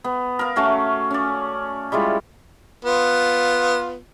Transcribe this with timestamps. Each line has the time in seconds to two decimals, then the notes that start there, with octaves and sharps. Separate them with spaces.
0.04 B3
0.39 A#4 F5
0.56 A3 C#4 F#4 F5
1.11 C#4 D5
1.92 G3 G#3 E4 F4
2.85 B3 F4